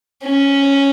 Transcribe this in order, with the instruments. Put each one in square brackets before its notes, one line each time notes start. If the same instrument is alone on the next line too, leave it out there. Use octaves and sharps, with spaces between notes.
[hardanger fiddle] C#4